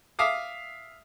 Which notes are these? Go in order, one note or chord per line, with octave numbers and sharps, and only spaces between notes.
E5 F5 D6 D#6